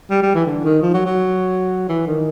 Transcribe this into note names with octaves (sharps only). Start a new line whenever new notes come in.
G3
G3
E3
D3
D#3
F3
F#3
F#3
E3
D#3